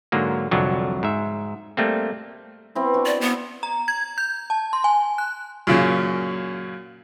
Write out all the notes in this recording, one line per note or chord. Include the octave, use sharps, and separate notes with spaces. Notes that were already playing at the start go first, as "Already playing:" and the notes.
G#2 D3 F#3 A#3
C2 F2 D3 F#3
G#2 E5
G3 A3 A#3 C4
B3 C4 E4
D4 F#4
D5
B3
A#5
G#6
G6
A5
C6
G#5
F#6
F#2 A#2 C#3